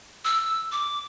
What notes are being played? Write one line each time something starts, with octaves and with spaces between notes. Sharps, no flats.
E6
D6